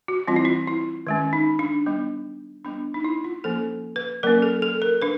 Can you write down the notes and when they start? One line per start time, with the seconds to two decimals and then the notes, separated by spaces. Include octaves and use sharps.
0.08 F#4
0.28 E3 G3 C4 F4
0.36 E4
0.45 F4
0.67 E4
1.07 D#3 G#3 C#4
1.33 D#4
1.59 D4
1.86 G3 B3 D4
2.65 G3 B3 D4
2.94 D#4
3.04 E4
3.24 F4
3.44 F3 A#3 C#4 A4
3.96 B4
4.23 F#3 A#3 C#4 A#4
4.42 A4
4.62 A4
4.82 A#4
5.02 D4 B4